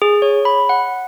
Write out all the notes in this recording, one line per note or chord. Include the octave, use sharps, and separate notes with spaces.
G#4
C#5
B5
F#5